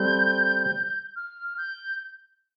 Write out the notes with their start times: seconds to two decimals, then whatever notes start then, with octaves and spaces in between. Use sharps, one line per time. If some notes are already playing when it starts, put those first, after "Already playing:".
Already playing: G3 C4 A4 G6
1.16 F6
1.58 G6